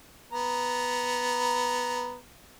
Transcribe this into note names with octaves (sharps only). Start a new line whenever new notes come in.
B3 A#5